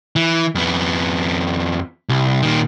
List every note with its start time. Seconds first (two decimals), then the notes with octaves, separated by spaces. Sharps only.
0.16 E3
0.55 F2 B3
2.09 C2
2.42 A#2 D#3